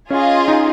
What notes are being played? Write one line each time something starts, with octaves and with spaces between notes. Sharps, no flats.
C#4 F4 G#4 D#5
D#4